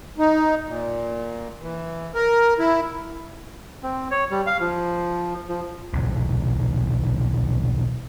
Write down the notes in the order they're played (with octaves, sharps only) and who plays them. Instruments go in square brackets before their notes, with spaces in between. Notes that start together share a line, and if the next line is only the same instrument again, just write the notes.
[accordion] D#4
A#2
E3
A#4
E4
[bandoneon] C4
C#5
G3
F5
F3
F3
[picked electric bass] D#1 B1